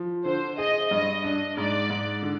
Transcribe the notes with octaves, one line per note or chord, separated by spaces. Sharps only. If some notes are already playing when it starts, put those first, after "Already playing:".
Already playing: F3
D3 C5
G#4 D#5
G2 D#5
D4 D#5
G#2 D5
G#2
D3